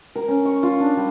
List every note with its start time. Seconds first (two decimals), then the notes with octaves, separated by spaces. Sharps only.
0.15 A#4
0.28 C#4
0.45 C#6
0.63 F4
0.80 D4
0.97 G3